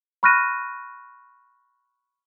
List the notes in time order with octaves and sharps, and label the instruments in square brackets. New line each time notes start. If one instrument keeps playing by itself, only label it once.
[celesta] B5 C#6 F6 F#6 A#6 D#7